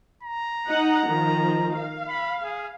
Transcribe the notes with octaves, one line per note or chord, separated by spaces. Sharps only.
A#5
D#4 F#5
D#3 F3
F5
B5
G#4